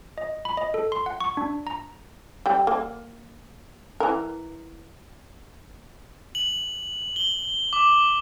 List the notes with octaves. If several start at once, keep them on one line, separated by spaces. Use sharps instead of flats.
D#5
B5
D#5
A4
C6
F#5
C#6
D4
A#5
G3 G5
A#3
E3 A#4
F#7
G7
D6